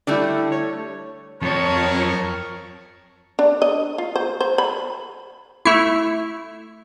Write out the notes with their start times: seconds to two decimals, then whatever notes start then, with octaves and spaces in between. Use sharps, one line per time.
0.07 D3 G3 A3 D4 E4
0.52 C#5
1.42 F2 A#4 C#5 A5
3.39 D4
3.62 D#5
3.98 F4
4.16 C5
4.41 C5
4.58 B5
5.65 A3 E4